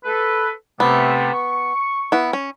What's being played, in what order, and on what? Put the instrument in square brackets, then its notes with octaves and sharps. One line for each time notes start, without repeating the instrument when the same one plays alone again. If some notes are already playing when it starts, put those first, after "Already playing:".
[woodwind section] A4 B4
[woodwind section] C3 A3 [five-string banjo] B3
[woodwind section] C#6
[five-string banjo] B3 E4
C#4